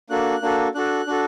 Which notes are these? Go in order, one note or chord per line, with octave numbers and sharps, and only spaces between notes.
A#3 D4 F#4 A4 F#6
A#3 D4 F#4 A4
D4 F#4 A4 F#6
D4 F#4 A4